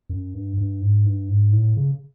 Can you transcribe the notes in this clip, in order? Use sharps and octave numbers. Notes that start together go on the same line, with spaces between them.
F#2
G2
G2
G#2
G2
G#2
A2
C#3